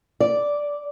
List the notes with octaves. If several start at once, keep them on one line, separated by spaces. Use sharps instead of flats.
D5